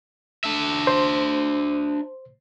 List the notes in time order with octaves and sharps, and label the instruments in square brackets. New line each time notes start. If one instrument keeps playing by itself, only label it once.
[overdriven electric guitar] D4 E5
[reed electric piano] C5